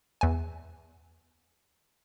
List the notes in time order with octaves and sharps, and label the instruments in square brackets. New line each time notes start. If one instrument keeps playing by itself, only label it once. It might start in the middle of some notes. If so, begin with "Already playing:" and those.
[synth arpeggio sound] E2 G#5